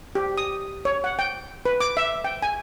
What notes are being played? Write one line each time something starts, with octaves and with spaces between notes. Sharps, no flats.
G4
D#6
C#5
F#5
G5
B4
D6
E5
G5
G#5